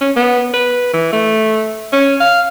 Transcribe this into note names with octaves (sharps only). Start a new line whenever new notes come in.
C#4
B3
B4
E3
A3
C#4
F5